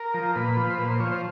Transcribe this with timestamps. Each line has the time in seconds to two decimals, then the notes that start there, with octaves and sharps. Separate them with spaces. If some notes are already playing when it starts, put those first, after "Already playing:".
Already playing: A#4
0.14 F3
0.36 A#2 B4
0.57 F3
0.70 C5
0.78 A#2 B4
0.90 C5
1.00 F3 C#5
1.12 C5